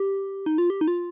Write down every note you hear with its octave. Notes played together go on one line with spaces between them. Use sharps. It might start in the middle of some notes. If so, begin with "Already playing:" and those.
Already playing: G4
D#4
F4
G4
D#4
F4